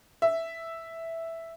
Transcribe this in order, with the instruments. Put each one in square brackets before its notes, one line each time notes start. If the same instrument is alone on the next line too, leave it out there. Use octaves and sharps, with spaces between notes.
[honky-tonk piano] E5